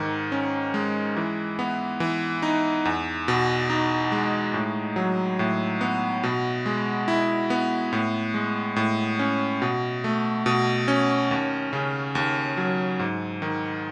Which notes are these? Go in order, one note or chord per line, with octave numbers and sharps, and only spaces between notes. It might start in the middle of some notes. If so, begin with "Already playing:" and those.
Already playing: G#2 D#3
C#4
G#3
E3
B3
E3
D#4
E2
B2
D#4
G#3
A2
F#3
A2
B3
B2
G#3
E4
B3
A2
G#3
A2
C#4
B2
A3
B2
C#4
D#2
C#3
D#2
F#3
G#2
D#3